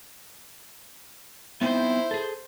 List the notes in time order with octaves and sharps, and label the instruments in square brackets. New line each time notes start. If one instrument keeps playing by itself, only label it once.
[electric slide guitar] B3 C4 D#4 [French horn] E4 [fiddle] C5
[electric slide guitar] G#4 A4